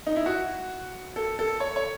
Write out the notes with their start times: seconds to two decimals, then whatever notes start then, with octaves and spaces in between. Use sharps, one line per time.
0.07 D#4
0.16 E4
0.26 F#4
1.16 A4
1.39 A4
1.60 C#5
1.76 C#5